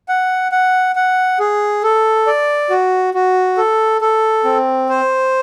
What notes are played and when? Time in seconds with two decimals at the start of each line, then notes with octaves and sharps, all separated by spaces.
0.09 F#5
0.52 F#5
0.96 F#5
1.40 G#4
1.83 A4
2.27 D5
2.70 F#4
3.14 F#4
3.57 A4
4.01 A4
4.44 C4
4.89 C5